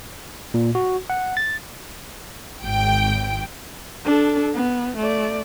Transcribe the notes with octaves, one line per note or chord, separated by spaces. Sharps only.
A#2
F#4
F#5
A6
G#1 G5
D4 A4
B3
A3 D5